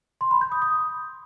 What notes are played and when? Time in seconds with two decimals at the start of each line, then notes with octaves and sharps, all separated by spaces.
0.21 C6
0.31 B5
0.41 G6
0.52 D#6
0.62 D#6